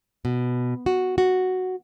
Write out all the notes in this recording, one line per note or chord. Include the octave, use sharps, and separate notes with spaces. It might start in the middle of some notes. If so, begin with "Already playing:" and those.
B2
F#4
F#4